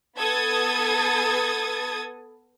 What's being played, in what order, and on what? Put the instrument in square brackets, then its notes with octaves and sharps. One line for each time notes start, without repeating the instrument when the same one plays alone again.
[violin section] B3 A4 D#6 G#6 A6